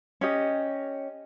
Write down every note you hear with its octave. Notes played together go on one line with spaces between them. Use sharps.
C#4 G4 D#5